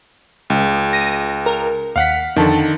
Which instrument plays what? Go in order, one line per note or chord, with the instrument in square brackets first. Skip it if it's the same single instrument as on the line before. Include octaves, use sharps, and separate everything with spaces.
[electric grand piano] C#2
[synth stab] A#6 D#7
A#4
[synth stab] D#2 B6 [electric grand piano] F5 F#5
[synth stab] F2 A5 [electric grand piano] D3 D#3